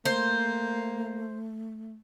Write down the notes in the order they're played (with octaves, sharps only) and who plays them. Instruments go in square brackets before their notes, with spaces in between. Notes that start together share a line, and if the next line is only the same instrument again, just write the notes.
[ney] A3 [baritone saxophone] A#3 [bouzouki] C5